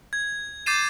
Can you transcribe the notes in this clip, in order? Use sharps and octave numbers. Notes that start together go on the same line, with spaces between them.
G#6
D6 G6 A6 C7 D#7 E7